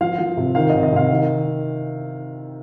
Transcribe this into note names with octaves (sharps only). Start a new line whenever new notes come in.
F3 F5
F3
C3
D#3 F5
D#5
C3
D#5
C3 F5
D#3